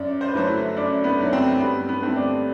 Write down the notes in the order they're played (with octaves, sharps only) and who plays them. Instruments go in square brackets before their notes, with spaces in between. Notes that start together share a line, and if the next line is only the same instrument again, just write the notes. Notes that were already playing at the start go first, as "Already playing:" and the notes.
Already playing: [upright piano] F#2 D5
C5
B4
D3 F#3 A3 C5
E4
F#2 D4
B3
D3 F#3 A3
C4
G2 B3
B3
D3 A3 C4
D4